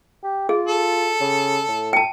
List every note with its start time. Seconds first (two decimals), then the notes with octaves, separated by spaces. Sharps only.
0.24 G4
0.49 F4 G#4
0.68 A4
1.20 C#3
1.68 A2
1.93 G5 A5